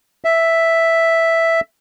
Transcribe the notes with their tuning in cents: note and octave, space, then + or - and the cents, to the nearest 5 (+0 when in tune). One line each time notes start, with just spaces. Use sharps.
E5 +0